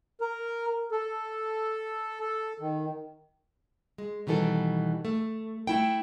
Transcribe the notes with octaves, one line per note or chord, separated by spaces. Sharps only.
A#4
A4
A4
D#3
G#3
B2 D#3 E3 G3 A4
A3
A3 E4 G5